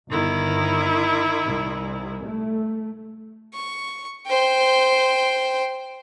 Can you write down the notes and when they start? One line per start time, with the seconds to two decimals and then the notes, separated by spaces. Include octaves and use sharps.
0.11 G1 D#3 E4
1.44 C2
2.25 A3
3.54 C#6
4.27 C5 G5